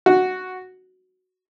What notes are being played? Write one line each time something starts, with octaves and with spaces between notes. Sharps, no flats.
F#4